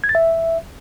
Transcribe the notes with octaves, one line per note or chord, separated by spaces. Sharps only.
G#6
A6
E5